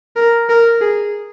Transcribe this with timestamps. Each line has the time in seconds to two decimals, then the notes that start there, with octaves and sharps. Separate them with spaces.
0.16 A#4
0.49 A#4
0.81 G#4